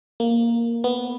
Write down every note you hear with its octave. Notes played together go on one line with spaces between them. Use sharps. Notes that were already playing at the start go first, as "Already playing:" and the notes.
A#3
B3